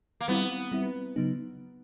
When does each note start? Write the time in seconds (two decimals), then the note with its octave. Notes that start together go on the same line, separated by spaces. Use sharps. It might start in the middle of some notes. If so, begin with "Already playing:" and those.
0.20 A#3
0.28 G3 B3 C4 E4
0.72 G3 C4 E4
1.16 C#3 F#3 B3 D#4